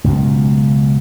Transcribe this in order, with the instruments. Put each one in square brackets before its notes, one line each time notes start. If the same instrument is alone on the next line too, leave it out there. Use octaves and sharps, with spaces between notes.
[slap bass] C#2 F#2 B2